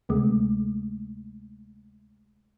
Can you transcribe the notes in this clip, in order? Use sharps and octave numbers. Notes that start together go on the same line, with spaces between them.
D2 C3 G#3 A3